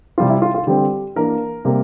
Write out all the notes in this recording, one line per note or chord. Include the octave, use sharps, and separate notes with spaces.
C3 G3 C4 F4
E4
F4
F4
D3 G3 C4 G4
E3 A#3 D4 A#4
C3 G3 A#3